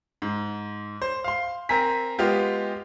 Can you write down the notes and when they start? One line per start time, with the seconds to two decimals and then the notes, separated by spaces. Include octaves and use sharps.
0.22 G#2
1.02 C5
1.24 F5 C6
1.69 C4 A#4 G#5 A#5 B6
2.19 G#3 B3 F4 G4